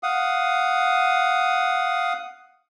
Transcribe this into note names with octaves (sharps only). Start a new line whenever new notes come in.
F5 F#5 D#6